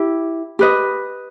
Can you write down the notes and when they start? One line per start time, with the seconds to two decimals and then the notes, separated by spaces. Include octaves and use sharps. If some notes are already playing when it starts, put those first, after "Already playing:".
Already playing: E4 G4
0.59 G4 B4 D#5